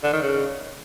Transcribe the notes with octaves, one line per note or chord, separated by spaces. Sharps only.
D3
D#3
C#3